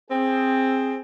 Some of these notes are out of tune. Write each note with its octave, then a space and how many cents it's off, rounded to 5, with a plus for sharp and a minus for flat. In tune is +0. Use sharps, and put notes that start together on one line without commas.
C4 +10 G#4 +0